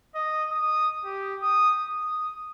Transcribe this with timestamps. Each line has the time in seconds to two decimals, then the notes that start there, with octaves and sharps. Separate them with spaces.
0.15 D#5
0.50 D#6
1.04 G4
1.42 D#6
1.87 D#6